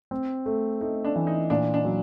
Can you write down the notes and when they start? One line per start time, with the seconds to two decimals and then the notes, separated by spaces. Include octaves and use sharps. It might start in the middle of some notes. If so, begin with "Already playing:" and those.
0.11 C4
0.46 A3
0.81 A3 D#4
1.05 D4
1.16 E3
1.27 D#4
1.50 A#2 D4
1.74 D4
1.85 F#3